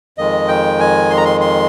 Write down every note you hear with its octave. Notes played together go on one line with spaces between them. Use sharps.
F2 D#3 G#3 D#5
G5
G#5
C6
A#5
C6
C6